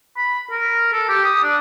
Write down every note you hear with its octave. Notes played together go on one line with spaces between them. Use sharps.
B5
A#4
A4
G4
D#6
D4